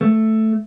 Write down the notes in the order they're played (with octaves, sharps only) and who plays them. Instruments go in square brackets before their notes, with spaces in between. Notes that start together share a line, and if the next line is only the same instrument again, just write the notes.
[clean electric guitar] A3